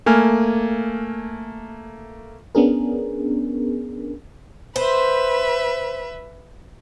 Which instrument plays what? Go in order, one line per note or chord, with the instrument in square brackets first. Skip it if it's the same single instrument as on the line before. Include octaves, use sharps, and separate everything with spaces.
[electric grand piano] A3 A#3 G#5 F6
[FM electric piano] B3 C#4 D4 G#4 A#4
[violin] B4 E5 [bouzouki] C5